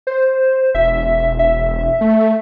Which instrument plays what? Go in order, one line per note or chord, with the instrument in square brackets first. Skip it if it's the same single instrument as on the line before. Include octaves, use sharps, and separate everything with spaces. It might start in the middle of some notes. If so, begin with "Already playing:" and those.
[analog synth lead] C5
[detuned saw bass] E1 [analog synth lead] E5
[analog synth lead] E5
[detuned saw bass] A3